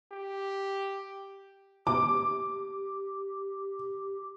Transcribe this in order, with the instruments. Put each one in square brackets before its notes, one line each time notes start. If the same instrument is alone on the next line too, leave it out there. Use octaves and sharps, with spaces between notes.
[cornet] G4
[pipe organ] G4 [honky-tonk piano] D6